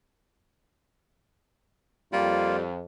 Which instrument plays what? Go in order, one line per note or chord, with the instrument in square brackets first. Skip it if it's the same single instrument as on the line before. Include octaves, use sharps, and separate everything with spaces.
[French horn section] F2 [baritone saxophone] G3 [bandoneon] A#3 F4